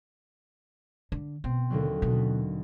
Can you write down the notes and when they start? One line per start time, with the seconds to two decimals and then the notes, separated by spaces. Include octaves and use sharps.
1.12 D3
1.44 B2 C4
1.70 D#2 D3 F#3
2.02 B2